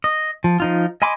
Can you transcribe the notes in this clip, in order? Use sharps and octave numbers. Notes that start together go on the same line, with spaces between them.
D#5
F3
F3 D#4 F4
D#5 G#5 B5 C6 D6